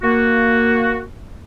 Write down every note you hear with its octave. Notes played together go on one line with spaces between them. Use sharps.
A#3 F#4